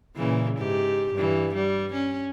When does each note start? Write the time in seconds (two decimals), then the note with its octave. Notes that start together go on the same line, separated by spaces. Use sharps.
0.17 A#2 C#3 E3
0.57 G#2 G4
1.14 G2 E3
1.54 G3
1.92 C#4